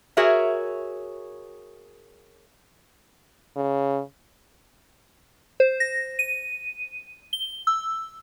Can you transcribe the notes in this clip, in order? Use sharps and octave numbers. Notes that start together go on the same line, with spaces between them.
F#4 G#4 A#4 C#5 E5
C#3
C5
A#6
D#7
G7
E6